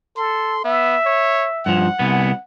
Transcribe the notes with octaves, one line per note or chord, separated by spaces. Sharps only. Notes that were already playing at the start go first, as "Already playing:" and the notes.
A4 C6
B3 E5
C#5
G2 F3 F#5
C2 B3